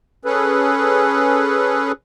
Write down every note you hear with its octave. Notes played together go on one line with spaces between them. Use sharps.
C#4 G#4 A4 B4